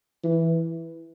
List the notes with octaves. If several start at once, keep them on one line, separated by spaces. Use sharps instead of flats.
E3